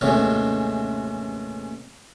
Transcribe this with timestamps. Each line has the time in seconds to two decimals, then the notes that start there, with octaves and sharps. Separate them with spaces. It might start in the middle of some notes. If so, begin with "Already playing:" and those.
0.01 A1 D#2 G#2 C3 E3 C#4